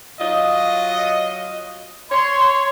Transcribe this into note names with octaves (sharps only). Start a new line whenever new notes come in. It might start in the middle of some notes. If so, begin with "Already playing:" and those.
F#3 F4 D#5
C#5 C6